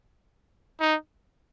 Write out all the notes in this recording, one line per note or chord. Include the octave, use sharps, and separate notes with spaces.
D#4